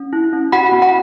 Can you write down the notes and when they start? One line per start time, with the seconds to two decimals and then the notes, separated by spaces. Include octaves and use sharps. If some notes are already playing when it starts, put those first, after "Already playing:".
Already playing: C#4
0.13 E4
0.33 C#4
0.52 F#4 F#5 B5
0.72 B3
0.82 F#5 B5